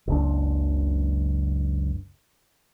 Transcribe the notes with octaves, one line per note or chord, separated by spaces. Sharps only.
F#1 C#2 D4